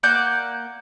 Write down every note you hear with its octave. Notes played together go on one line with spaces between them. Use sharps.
A#3 D5 F#5 G6